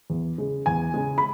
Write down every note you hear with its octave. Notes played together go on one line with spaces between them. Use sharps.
E2
C#3 G#3
E2 G#5
C#3 G#3
B5